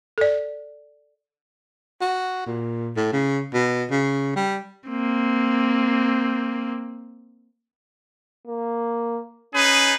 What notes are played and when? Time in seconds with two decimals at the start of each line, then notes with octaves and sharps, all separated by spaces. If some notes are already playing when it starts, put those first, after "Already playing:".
0.18 A4 D5
2.01 F#4
2.46 A#2
2.96 A2
3.13 C#3
3.54 B2
3.91 C#3
4.36 G3
4.89 A#3 C4
8.47 A#3
9.53 C#4 D#4 G#4 B4